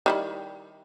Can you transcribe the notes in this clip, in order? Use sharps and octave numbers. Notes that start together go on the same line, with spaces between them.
D#3 G3 E4